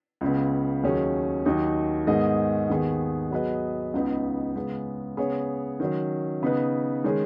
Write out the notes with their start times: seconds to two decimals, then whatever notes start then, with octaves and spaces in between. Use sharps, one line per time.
0.21 C#2 C#3 B3
0.83 D#2 D#3 F#3 C#4 G#4
1.46 D#2 D#3 F#3 D#4
2.07 G#2 D#3 B3 G#4 D#5
2.69 D#2 D#3 B3 G#4
3.31 F#3 B3 G#4 B4 D#5
3.93 C#2 C#3 B3 D#4
4.56 C#3 G#3 B3
5.17 C#3 B3 G#4 C#5
5.80 D#3 F#3 C#4
6.42 C#3 B3 D#4 B4
7.04 D#3 G#3 C#4 G#4